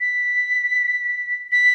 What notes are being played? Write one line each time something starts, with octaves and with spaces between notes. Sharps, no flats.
B6
B6